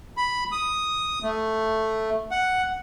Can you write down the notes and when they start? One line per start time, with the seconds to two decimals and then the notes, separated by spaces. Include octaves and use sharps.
0.17 B5
0.52 D#6
1.23 A3
2.31 F#5